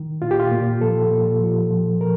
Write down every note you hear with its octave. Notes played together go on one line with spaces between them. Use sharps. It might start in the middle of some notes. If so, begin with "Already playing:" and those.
Already playing: D#3
A#2 F4
G4
F4
A#2
F3 A4
A#2
F3
F3
F3 A#4